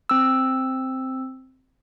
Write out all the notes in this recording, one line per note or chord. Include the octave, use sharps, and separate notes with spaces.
C4 E6